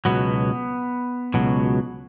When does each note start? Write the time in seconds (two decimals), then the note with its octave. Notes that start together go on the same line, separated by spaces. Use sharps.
0.05 C#2 B2 F#3 B3
1.34 C#2 B2 F#3